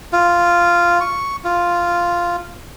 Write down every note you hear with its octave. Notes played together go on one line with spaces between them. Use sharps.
F4
C#6
F4